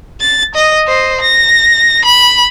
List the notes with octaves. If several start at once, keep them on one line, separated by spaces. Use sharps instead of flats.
A6
D#5
C5 D#5
A#6
B5